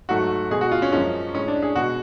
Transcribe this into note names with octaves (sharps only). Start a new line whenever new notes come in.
G#2 F#3 A3 F#4
B2 G#3 G#4
F#4
F4
C#4
F#2 F3 G#3 C#4
A2 G#3 C#4
D4
G#4
B2 G#3 F#4